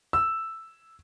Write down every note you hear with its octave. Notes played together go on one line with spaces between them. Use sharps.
E6